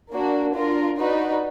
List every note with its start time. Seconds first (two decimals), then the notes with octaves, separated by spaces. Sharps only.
0.11 A#3 D4 F#4
0.54 D4 F4 A#4
0.98 D#4 F#4 B4 D5